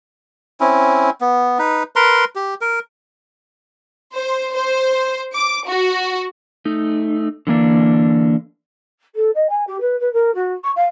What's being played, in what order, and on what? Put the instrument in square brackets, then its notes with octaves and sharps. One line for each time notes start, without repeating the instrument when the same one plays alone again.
[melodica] C4 C#4 E4
B3
D#4 B4
A#4 B4 A#5 C6
G4
A#4
[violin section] C5
C5
D6
F#4
[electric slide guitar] A3 D#4
D3 E3 A#3 D4
[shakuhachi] A4
D#5
G#5
G4
B4
B4
A#4
F#4
C#6
F5